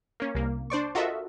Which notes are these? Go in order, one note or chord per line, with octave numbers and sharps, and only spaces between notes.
A#3 C#4
C2 A#3
D4 C5 D5 C#6
F4 F#4 A4 A#4 D#5 E5